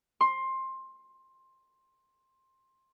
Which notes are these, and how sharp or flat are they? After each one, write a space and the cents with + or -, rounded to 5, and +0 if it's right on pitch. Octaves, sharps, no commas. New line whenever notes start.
C6 +15